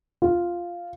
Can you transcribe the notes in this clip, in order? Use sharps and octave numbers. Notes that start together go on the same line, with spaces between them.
F4